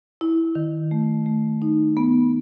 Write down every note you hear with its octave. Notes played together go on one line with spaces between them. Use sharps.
E4
D#3
A3
A3
D#4
B3